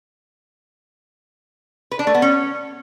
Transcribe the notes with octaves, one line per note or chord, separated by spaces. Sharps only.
B4
D4
A3
B3
C#4